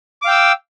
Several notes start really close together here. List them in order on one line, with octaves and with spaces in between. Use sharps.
D6 F5 G5 E6